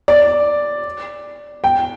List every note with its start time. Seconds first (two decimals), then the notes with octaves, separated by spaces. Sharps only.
0.08 D5
1.64 G5